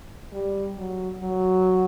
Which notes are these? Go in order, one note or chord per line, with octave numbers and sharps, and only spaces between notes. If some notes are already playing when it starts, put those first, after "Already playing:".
G3
F#3
F#3